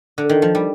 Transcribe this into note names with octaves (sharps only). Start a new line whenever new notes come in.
D3
D#3
F3
G3